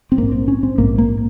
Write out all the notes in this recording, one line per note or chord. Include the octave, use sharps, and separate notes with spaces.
C4
A#1 G#2 A#3
C4
C#4
C4
A#1 G#2 A#3
A#3